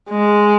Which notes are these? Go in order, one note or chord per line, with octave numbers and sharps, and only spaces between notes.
G#3